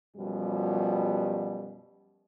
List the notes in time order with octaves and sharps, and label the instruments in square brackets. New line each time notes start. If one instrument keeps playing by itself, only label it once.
[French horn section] F#2 B2 F3 G3